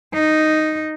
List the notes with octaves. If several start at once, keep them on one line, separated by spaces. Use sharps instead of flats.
D#4